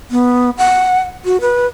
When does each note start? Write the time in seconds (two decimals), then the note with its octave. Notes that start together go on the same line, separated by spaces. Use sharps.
0.11 B3
0.58 F#5
1.25 F#4
1.41 B4